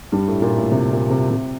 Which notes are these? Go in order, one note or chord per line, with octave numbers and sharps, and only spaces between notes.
G2 G3
A2 A3
A#2 A#3
A2 A3
C3
A#2
C3
C3